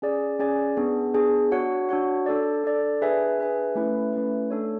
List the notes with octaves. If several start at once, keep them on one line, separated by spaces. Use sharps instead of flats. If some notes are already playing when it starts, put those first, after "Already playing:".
C#4 G#4 D5 G#5
C#4 G#4 D5 G#5
B3 D4 G#4
B3 D4 G#4
D4 F#4 C#5 F#5
D4 F#4 C#5 F#5
D4 A4 D5
D4 A4 D5
D4 G#4 B4 E5 G#5
D4 G#4 B4 E5 G#5
A3 C#4 E4 B4
A3 C#4 E4 B4
A3 D4 A4 C#5